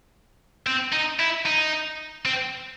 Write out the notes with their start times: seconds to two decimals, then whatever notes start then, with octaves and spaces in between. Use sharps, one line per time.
0.67 C4
0.93 D#4
1.20 E4
1.46 D#4
2.26 C4